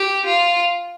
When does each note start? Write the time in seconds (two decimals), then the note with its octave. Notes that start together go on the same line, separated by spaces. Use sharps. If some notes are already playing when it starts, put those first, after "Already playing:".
Already playing: G4
0.26 F4